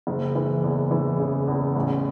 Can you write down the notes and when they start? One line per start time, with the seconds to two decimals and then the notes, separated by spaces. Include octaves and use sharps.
0.07 F#1
0.35 E3
0.64 E2
0.91 E3
1.19 C#3
1.47 E2
1.75 A1